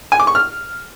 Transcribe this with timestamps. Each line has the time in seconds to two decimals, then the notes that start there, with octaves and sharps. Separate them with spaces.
0.12 G#5
0.20 D6
0.27 C#6
0.35 F6